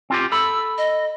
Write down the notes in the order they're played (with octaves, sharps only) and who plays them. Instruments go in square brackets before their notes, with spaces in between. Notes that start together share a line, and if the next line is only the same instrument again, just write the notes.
[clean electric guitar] C4 F4 G4
[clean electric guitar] A4 B5 [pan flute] E6
[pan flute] D#5